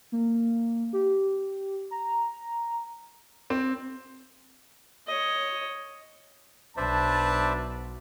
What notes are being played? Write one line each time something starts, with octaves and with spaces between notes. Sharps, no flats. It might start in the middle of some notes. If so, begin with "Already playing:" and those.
A#3
G4
A#5
C4
C#5 D#5
B1 F#3 D4 B4 C5 D5 E5 A5